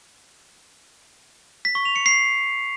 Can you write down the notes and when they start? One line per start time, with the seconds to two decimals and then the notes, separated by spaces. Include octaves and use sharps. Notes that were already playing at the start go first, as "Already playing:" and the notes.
1.65 B6
1.75 C#6
1.85 F7
1.96 C#7
2.06 C7